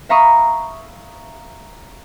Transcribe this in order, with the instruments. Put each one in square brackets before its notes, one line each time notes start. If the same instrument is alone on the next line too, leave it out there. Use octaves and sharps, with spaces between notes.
[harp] E5 F5 A#5 B5 C#6 D#6